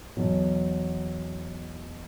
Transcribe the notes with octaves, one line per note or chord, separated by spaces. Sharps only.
E2 B2 F#3